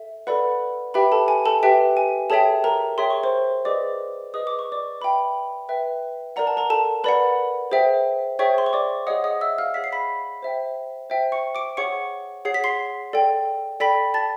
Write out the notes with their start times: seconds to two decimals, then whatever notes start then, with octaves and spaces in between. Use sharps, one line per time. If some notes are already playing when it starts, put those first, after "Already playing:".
Already playing: A4 E5
0.27 A4 B4 D5 F#5 B5
0.94 G4 B4 E5 G5 B5
1.12 A4 A5
1.28 G#5
1.46 A4 A5
1.63 G4 B4 E5 G5
1.97 G#5
2.30 G#4 A4 C#5 E5 G5 A5
2.64 A#4 A#5
2.98 G#4 C#5 E5 G5 C6
3.10 C#6
3.23 C5 C6
3.65 G#4 B4 D5 D#5 D6
4.34 G#4 B4 D#5 D#6
4.47 D6
4.59 C#6
4.72 D5 D6
5.01 B4 E5 G5 B5
5.69 B4 E5 G5
6.36 A#4 D5 F#5 A#5
6.47 A5
6.57 A#4 A#5
6.70 A4 A5
7.04 A#4 B4 D5 F#5 B5
7.71 G#4 C5 E5 G5
8.39 G#4 C5 C#5 E5 G5 C#6
8.58 C6
8.66 C#6
8.73 D5 D6
9.07 G#4 C#5 D#5 F#5 D#6
9.24 D#5 D#6
9.41 E5 E6
9.58 F5 F6
9.74 G#4 C#5 F#5 B6
9.84 C7
9.92 B5 B6
10.43 C5 E5 G5
11.10 C5 E5 G5
11.32 C#6 C#7
11.55 D6 D7
11.77 G#4 C#5 F#5 C#6 C#7
12.45 G#4 C#5 F#5 C7
12.54 B6
12.64 C6 C7
13.13 A4 D5 G5
13.80 A4 D5 G5 B5 B6
14.14 A5 A6